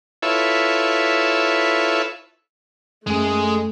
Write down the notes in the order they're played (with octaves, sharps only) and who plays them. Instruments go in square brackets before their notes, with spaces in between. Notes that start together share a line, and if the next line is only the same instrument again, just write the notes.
[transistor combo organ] E4 F4 A4 B4 C#5 E5
[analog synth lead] F#2 [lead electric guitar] G#3 G#4 [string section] A3